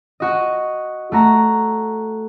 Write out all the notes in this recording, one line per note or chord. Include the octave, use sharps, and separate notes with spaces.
F#4 D#5
A3 F#4 A#5